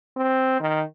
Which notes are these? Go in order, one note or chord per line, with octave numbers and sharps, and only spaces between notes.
C4
D#3